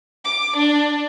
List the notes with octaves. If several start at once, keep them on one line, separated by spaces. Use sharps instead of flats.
D6
D4